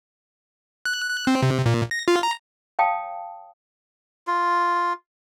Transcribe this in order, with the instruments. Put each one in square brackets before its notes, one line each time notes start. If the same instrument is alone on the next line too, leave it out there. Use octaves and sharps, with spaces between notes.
[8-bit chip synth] F#6
F#6
C4
C3
A#2
A#6
F4
A#5
[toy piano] C#5 F5 G5 A5 D#6
[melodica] F4